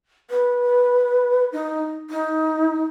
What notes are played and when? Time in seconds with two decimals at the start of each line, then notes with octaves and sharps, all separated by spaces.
0.30 B4
1.53 D#4
2.10 D#4